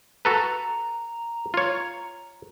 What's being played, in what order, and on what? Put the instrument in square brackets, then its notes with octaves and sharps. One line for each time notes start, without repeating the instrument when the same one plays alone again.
[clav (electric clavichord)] F#4 A4 B4 [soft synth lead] A#5
[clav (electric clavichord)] F4 C#5